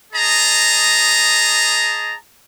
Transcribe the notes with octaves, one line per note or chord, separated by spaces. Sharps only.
G#4 D#5 A5 A#5